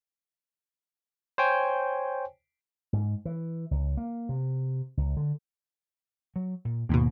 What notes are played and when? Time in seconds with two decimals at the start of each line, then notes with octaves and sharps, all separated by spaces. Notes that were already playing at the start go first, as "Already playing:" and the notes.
1.38 C5 C#5 G5 G#5
2.93 G#2
3.25 E3
3.71 C#2
3.97 A#3
4.29 C3
4.97 C#2
5.17 D3
6.36 F#3
6.65 A#2
6.89 D#2 G#2 B2 A#3